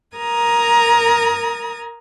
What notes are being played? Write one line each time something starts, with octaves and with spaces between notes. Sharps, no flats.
A#4 A#5 D#6 G#6